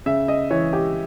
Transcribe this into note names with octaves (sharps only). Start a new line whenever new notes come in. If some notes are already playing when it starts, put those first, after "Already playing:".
C#3 E5
D#5
E3 C#5
G4